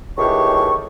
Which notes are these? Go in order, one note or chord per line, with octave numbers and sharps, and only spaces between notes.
C#2 A2 D#3 E3 G4 C#6